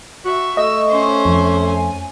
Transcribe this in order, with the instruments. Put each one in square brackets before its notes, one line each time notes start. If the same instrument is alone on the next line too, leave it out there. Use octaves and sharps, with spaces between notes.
[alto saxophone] F#4 [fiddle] E5 [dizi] C#6
[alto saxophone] A3 [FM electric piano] D#5 [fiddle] E6
[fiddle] C#4 C5
[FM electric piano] F2
[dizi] G#5